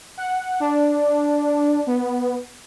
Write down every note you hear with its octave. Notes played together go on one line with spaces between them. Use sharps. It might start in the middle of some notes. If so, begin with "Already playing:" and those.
F#5
D4
B3